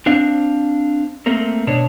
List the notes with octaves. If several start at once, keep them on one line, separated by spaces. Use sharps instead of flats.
C4 D4 C5 F5
A3 A#3 C4 A#4
B2 D4 C#5